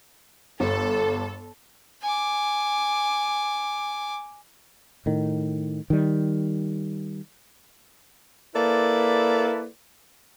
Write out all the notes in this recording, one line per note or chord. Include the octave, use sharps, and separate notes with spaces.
G1 A4
G#5 D6
A2 D#3
D#3 G3
A#3 E4 A4 B4 D5